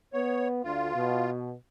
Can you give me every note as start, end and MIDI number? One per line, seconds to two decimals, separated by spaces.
0.13 0.61 59
0.13 0.48 73
0.64 0.94 38
0.64 1.30 65
0.95 1.52 47